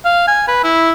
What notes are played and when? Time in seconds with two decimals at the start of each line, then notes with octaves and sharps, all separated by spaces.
0.05 F5
0.28 G#5
0.48 B4
0.64 E4